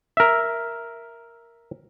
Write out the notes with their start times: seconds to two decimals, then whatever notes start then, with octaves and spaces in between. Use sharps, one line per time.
0.17 A#4 E5